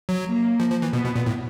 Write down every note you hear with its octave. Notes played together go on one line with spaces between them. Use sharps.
F#3
A#3
F3
F3
E3
B2 B3
B2
A#2
A2